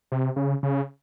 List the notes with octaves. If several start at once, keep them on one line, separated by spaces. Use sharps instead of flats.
C3
C#3
C#3